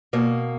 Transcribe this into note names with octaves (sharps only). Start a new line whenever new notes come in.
B2 A#3